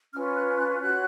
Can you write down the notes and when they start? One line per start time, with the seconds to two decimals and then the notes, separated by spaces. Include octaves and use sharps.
0.14 C#4 F4 B4 F6
0.36 F#6
0.57 F#6
0.79 F#4 C#5 F#6